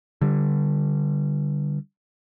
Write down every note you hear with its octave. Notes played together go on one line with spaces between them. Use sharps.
D3 G3